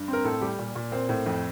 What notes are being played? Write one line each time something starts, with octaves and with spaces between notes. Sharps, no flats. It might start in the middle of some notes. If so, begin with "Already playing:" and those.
Already playing: G2
C4
A#4
A2 A4
G3 G4
A#2
A#2
A#3 C4
A2
F2